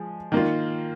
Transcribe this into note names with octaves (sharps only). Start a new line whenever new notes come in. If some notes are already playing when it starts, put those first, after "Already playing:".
Already playing: F3 G#3 G#4
D#3 A#3 F4